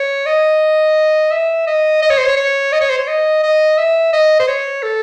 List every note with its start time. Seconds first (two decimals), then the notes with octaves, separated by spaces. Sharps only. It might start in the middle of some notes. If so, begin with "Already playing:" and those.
Already playing: C#5
0.26 D#5
1.31 E5
1.67 D#5
2.02 D#5
2.10 C#5
2.18 C5
2.26 C#5
2.37 C#5
2.72 D#5
2.81 C#5
2.90 C5
2.99 C#5
3.07 D#5
3.43 D#5
3.78 E5
4.13 D#5
4.40 C5
4.48 C#5
4.83 A4